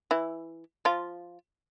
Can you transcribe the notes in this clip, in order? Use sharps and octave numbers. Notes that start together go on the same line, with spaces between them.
E3 E4
F3 F4